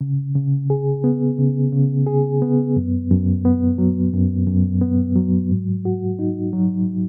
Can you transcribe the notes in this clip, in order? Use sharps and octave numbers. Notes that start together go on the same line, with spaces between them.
C#3
C#3
G#4
B3
C#3
C#3
G#4
B3
F#2
F#2
B3
F#3
F#2
F#2
B3
F#3
G#2
F#4
D#4
F#3